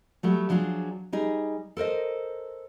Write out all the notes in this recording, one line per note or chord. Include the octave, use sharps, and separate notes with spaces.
F#3 G3 A3
F3 F#3 D4 G#4
G3 D#4 G#4
A4 A#4 C5 D#5